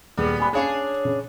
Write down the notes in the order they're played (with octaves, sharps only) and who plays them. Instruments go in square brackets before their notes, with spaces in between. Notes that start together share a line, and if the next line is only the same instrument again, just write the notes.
[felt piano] D#1 G#4 [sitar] G3 B3
[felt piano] G#5 B5
[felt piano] C#4 F5 G#5 [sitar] D4 G#4 C#5
[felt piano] C#3